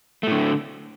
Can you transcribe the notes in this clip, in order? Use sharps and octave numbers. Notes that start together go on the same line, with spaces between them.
A2 D3 A3